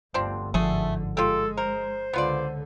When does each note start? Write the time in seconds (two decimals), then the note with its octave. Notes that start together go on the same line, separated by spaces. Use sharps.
0.14 G1 D2 F3 C4 D4
0.54 G1 G#2 D3 F3 A3 G#4
1.17 G#3 F4 G4 A4
1.57 A#4 C5
2.13 C#2 D3 B3 F4 D5